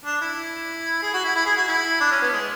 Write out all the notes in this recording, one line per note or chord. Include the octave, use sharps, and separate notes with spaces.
D4
E4
G#4
F#4
E4
E4
G#4
F#4
E4
D4
C#4
B3
G#3